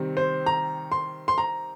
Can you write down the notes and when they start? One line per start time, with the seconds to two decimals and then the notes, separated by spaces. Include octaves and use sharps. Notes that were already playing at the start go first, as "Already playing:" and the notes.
Already playing: C3 D#3 G3 C4
0.17 C5
0.46 A#5
0.92 C6
1.28 C6
1.38 A#5